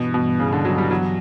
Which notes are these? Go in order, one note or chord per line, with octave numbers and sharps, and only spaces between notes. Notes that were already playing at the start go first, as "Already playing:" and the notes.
Already playing: G2 B2 E3 B3
B2
C#3
D3
F#3
G3
F#3